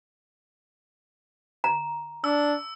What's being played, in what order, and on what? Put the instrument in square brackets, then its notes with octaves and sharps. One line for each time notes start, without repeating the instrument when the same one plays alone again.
[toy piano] A#5
[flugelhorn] D4 [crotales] E6